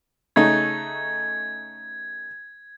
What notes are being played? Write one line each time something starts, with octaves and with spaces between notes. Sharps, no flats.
C#3 A3 D#4 G#6